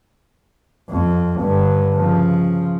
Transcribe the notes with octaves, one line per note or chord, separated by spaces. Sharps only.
F2
G2 D3
C#3 F3